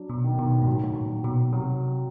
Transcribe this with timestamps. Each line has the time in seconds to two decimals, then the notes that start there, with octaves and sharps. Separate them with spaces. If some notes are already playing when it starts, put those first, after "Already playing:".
Already playing: F#3 D4
0.10 B2
0.24 D#3
0.39 B2
0.62 G#2
0.67 A2 F#3
0.84 A2
0.95 A#2
1.10 F#3
1.24 B2
1.52 C3 F#3